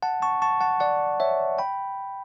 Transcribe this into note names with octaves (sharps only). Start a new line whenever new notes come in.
F#5 A5
A5 C#6
A5 C#6
F#5 A5
D5 F#5
C#5 E5
G5 B5